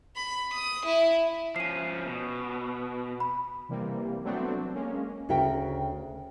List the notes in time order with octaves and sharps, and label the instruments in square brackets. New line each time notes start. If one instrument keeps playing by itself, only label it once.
[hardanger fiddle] B5
D#6
E4
[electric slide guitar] F3 C#4 [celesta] C7 D#7
[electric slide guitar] B2
[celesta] B5
[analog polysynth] C3 E3 G3 A#3
F#3 A3 B3 C4 D4 F#4
G#3 A#3 C#4
[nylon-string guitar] D2 C#3 F#4 A#4 E5 G5